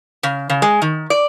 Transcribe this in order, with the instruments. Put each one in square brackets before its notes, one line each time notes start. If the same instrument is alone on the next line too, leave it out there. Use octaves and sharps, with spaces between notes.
[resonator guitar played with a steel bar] C#3
C#3
G#3
D#3
D5